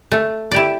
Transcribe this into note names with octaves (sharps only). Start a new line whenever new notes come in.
A3
E4 G4 D5